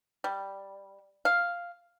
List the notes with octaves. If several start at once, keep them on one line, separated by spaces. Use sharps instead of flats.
G3
F5